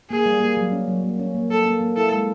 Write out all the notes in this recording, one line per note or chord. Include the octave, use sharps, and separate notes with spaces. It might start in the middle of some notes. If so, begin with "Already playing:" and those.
A#3 G#4
G3
A#3
F#3
C#4
F#3
A#3
C#4
A#3
A#3 A4
A#3
A#3
E4 A4
G#3